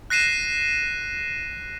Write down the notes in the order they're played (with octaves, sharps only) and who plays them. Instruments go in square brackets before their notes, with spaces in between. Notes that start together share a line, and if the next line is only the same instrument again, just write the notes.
[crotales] F#6 A#6 C7 D#7 E7